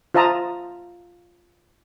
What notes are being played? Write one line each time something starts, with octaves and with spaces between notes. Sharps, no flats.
F4 C5 E5 A5 A#5 D#6